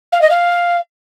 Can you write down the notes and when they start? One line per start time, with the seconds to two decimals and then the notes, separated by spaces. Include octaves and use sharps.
0.12 F5
0.21 D#5
0.30 F5